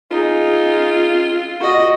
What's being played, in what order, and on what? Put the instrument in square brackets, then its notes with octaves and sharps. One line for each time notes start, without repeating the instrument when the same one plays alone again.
[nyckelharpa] D#4 G#4 [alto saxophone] F4
[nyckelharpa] F#4 D#5